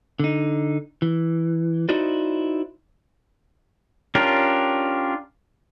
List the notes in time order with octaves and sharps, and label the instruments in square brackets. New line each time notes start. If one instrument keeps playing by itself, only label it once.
[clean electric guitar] D3 D#4
E3
D#4 E4 F#4 C5 D5 D#5
[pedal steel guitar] C#4 D4 F4 G4 A#4